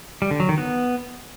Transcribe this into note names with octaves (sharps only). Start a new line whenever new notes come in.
G3
D3
F#3
D#3
B3